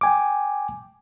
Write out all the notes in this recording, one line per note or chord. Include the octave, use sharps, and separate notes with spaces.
G5 G#5 D6